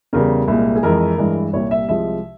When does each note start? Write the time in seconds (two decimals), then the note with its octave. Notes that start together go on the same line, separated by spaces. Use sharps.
0.13 E2 C#3 G3 A#4
0.48 C2 A#2 G#3
0.76 G#4
0.83 F2 E3 G#3 A#4
1.18 G2 E3 G#3
1.53 C2 A#2 G3 C#5
1.71 E5
1.88 C2 C3 F3 G#3 E5